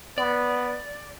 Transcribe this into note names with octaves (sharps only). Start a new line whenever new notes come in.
B3 D5